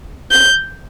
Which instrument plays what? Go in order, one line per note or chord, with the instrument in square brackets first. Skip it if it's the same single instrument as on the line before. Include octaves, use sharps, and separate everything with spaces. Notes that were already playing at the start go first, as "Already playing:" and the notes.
[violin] G6